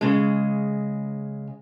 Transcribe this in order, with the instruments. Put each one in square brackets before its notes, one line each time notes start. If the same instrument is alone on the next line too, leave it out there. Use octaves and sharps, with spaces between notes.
[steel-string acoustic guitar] C#3 G#3